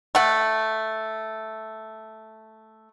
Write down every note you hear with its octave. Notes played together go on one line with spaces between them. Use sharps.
A3 F#5